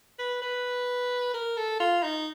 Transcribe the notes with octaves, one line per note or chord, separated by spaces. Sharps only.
B4
B4
A#4
A4
F4
D#4